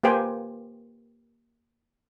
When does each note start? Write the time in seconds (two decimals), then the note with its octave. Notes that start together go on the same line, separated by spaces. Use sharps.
0.03 A#3 G4 B4 C5 G5 G#5